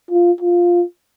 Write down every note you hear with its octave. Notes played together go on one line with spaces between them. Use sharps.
F4
F4